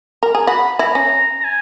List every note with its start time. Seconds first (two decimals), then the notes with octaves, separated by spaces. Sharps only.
0.23 A#4
0.35 G#4
0.47 F#4 B5
0.79 E4 A#5
0.95 C#4
1.40 A#5
1.44 G#5